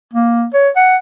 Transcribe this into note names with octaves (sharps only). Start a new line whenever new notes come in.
A#3
C#5
F#5